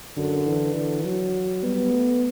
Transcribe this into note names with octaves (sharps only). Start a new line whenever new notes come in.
F#2 D3
E3
D3
F#3
G3 B3
A3